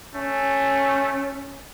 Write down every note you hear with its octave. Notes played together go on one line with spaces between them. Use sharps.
A3 C#4